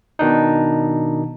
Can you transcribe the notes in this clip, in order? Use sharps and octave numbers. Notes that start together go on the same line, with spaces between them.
B2 D#3 D4 D#4